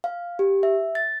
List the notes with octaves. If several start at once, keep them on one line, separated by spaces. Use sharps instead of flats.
F5
G4
E5
A6